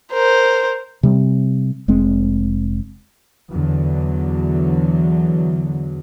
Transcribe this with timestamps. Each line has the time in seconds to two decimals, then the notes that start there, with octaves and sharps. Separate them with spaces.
0.12 A#4 C5
1.03 C3 G3 G#3 C4
1.88 F1 G#3 C4
3.50 E2 D3 F#3